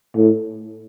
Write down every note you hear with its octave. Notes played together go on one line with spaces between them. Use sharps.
A2